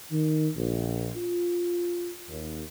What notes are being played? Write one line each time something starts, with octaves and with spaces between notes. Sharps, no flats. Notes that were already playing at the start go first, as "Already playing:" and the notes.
D#3
A#1
F4
D#2